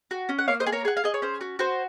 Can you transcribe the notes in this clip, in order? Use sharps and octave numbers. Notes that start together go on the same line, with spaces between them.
F#4
C#4
F#5
A#3 C#5 F5
C5 D#5
G#4
A#4 C#5
G#4 F#5
F5
G#4 D#5
C#5
C#4 C5
F#4
F#4 C5